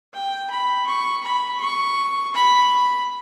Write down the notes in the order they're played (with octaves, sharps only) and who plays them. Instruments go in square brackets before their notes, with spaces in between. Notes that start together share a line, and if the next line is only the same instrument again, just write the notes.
[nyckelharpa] G5
B5
C#6
B5
C#6
B5